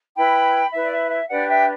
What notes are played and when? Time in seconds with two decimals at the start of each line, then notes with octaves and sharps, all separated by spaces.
0.16 E4 B4 G5 B5
0.72 E4 B4 E5
0.82 D5
0.91 E5
1.10 E5
1.29 D4 G4 B4 D5 F#5
1.48 E5 G5